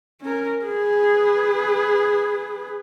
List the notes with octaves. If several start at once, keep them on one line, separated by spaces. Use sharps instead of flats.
C#4 A#4
G#4 B4